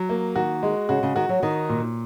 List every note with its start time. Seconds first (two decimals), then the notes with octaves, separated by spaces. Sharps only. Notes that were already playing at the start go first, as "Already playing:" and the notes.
Already playing: F#3
0.09 A#3
0.36 D#3 F#4
0.63 G#3
0.89 C#3 F#4
1.03 C#3
1.16 D#3 F#4
1.29 F#3
1.43 D#3 D#4
1.69 A#2